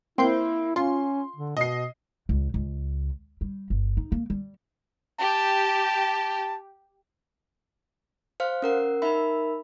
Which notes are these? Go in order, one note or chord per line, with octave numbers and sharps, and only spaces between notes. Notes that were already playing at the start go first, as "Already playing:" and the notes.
A#3 C4 E4 C6 G6
C#4 F4 C6
D3
B2 D#5 C7
C#2
C#2
G3
G1
D#4
A#3
G3
G4 A5
C5 F5 F6
C#4 A#4 F#5
D#4 A#4 E5 B5